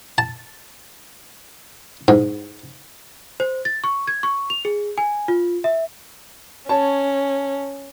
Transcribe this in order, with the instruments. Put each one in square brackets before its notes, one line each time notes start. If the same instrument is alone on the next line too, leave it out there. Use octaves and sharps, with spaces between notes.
[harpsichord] A5
G#2
[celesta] C5
A6
C#6
G#6
C#6
F7
G#4
G#5
F4
E5
[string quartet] C#4 [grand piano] C#5 A5